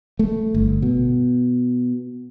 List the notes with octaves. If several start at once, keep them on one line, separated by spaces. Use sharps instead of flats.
A3
G1
B2